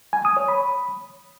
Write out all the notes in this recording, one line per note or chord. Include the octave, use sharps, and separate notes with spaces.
G#5
D#6
C#5
B5